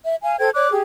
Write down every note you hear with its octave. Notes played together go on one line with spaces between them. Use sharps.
E5
F5 G#5
A4 C5 G5 G#6
C#5 D5 D6 F#6
G4 G#4